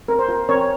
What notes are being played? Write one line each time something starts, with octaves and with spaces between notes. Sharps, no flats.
C4 A#4
C5
F4 A#4
C4 A#4 C#5